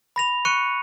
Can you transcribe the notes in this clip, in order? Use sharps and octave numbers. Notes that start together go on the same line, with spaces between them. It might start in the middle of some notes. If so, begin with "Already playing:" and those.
B5 A#6 F7
C#6 F#6 C#7 D#7